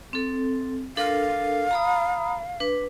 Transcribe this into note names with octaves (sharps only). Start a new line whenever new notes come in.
C4 A4
D4 A4 A#4 F5
A#5 B5 D#6
D4 B4